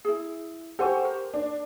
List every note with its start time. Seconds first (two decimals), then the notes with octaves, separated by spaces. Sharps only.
0.05 E4 G#4
0.79 G4 A4 C5 F#5 G#5 C#6
1.05 A#4
1.34 D4